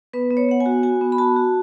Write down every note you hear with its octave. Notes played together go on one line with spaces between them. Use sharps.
B3 B4
B3
C#5
B3 F#5
G#5
F#4
F#4 G#5
B3
B5
F#4 A5
F#4